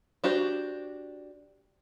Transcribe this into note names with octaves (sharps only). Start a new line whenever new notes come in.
D4 F#4 G4 C5